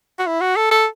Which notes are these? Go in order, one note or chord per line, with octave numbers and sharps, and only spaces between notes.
F#4
E4
F#4
A4
A4